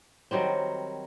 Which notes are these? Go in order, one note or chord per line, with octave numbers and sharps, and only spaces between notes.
D#3 F#3 G3 C4